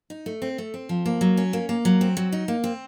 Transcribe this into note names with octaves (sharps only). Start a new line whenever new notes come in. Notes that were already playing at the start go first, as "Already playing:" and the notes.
D#4
A3
C4
A3
C4
F3
A#3
F#3
C#4
A#3
A#3
F#3
C4
F#3
D#4
A#3
C4